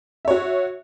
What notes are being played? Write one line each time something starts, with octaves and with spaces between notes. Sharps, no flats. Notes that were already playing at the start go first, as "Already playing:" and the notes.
F#4 C#5 E5